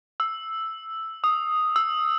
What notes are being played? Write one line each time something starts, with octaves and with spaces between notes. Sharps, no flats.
E6
D#6
E6